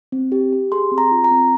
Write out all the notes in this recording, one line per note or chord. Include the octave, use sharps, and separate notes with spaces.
C4
G4
G4
G#4 C6
C4
A#5
F4
A#5
C4